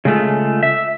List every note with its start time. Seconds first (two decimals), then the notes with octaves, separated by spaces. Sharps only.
0.05 C#3 G#3 A3 F4
0.63 E5